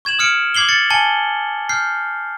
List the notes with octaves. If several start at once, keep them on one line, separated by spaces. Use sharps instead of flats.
C#6 G#6 E7 F#7
D#6 F6 C#7 D7
D6 G#6 C7 F#7 G7
A6 C#7
G#5 A5 C#7 G7
F6 G6 C7